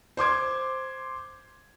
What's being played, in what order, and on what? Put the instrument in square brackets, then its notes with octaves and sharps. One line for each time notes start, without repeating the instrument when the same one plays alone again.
[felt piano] C5 C6 D6 G#6